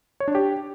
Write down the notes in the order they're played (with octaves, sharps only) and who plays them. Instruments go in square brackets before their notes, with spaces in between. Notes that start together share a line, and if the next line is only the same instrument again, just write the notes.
[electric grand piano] C#5
D4
G4